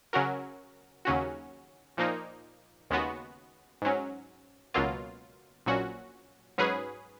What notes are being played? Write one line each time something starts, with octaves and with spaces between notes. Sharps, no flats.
C#3 F#3 C#4 F#4 A#4
D#2 C#3 F#3 C#4 F#4
A#2 F3 A#3 D#4
D#2 C#3 G#3 B3 F#4
G#2 F#3 C#4
C#2 B2 F#3 A#3 F4
A#1 A#2 F#3 C#4 F#4
G#2 F#3 C#4 G#4 B4